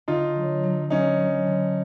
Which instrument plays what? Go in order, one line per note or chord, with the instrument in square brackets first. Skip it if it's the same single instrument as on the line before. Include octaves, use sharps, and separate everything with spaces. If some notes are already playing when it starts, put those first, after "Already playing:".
[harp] D3 [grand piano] D#4 F4
[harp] F#3
F#3
[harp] F#3 [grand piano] C#4 D#4
[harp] F#3
D3